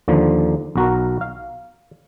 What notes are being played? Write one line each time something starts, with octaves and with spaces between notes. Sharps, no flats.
D#2 D3 F3
B1 F#4 A#4
F5